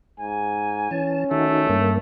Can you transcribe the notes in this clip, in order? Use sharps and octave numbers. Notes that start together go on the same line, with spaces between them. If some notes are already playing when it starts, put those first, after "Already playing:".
G#2 G#5
E3 C#4 A5
D#3 A3 D#4 F#4
G2 A#3